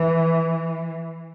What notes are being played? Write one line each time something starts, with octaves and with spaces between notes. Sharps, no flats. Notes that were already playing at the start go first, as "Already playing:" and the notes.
Already playing: E3